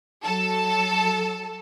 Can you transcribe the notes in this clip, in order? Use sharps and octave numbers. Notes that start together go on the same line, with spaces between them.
F#3 A4